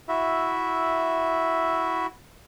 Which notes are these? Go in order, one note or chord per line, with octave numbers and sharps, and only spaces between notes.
E4 F#4 E5